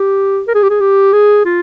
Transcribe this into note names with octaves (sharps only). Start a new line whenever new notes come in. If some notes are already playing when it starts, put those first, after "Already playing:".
Already playing: G4
A#4
G#4
G4
G#4
G4
G#4
F4